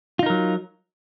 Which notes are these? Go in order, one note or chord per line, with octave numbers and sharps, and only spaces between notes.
F#3 D#4 F4 A#4